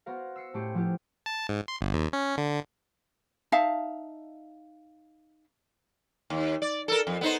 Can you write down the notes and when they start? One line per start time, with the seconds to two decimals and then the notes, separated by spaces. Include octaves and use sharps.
0.06 B3 F#4 A#4 C5 F5
0.36 E6 C7 C#7
0.54 A2 A3 C#4 G4 C5 C#7
0.74 F3 B3 E4 F4 G4
1.26 A5
1.49 G#2
1.68 C6
1.81 G1
1.94 D#2
2.13 C#4
2.37 D3
3.52 D#4 E5 F5 A5
6.30 D#2
6.62 D5
6.88 A4 A#4
7.07 F2
7.21 B3 D#4 C5